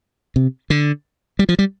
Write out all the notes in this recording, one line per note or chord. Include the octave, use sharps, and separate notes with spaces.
C3
D3
G3
F3
G3